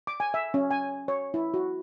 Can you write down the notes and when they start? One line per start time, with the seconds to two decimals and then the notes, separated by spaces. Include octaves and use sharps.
0.07 D6
0.20 G#5
0.34 E5
0.54 C#4
0.71 G#5
1.08 C#5
1.34 E4
1.54 F#4